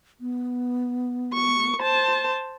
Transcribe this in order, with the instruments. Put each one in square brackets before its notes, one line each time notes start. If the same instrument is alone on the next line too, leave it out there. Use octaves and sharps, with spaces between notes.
[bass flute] B3
[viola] C#6
C5 A5